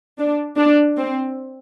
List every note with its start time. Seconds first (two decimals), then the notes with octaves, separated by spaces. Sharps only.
0.18 D4
0.58 D4
0.97 C4